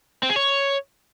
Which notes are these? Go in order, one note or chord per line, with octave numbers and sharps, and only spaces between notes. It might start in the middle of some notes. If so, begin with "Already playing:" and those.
C4
G#4
C#5